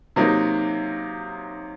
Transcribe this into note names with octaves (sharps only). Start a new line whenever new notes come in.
C3 F#3 A#3 D#4